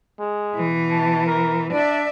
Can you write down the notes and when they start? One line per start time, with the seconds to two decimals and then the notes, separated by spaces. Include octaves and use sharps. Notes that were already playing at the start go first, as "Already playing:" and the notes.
0.19 G#3
0.55 B2 E3
0.91 A5
1.27 A#4
1.72 D4 D5 E5